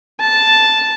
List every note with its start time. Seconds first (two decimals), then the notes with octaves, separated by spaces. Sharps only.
0.20 A5